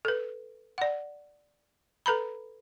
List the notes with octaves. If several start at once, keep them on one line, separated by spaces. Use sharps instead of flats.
A4 B4
D5 F#5
A4 B4 A#5 B5